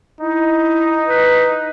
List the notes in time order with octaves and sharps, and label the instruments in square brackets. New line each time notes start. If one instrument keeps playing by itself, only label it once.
[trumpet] D#4 [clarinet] E4
[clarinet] B4